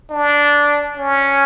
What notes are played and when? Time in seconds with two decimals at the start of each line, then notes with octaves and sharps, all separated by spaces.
0.11 D4
0.97 C#4